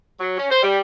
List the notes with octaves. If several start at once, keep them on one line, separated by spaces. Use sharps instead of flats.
F#3
C#4
C5
G3